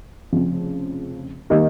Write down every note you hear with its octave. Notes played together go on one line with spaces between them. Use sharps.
F1 F2 C#3 F3 C4
D#3 G3 A#3 D#4